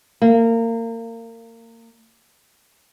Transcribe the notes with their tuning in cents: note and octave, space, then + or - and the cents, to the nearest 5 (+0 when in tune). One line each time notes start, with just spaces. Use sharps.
A#3 -30